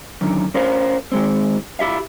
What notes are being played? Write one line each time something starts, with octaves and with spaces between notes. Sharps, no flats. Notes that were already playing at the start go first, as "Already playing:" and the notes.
F#2 D3 D#3
C#4 A#4 C5 F5
D#3 G#3 C4
E4 G4 E5 F5